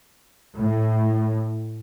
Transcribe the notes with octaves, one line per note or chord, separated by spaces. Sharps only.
A2